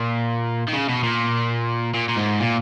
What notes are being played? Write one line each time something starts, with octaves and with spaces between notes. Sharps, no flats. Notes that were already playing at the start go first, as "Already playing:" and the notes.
Already playing: A#2
D#3
C#3
B2
A#2
A#2
A#2
G#2
A#2